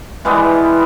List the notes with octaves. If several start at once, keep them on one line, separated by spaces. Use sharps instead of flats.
E3 G3 G#3 B3